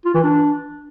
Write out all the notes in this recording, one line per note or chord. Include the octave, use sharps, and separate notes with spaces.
F4
E3
D4